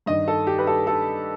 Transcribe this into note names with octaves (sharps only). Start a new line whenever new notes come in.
G2 D#3 D#5
A4
G4
B4
A4
A4